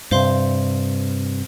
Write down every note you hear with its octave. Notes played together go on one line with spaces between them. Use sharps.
G2 C3 C5 F5 C6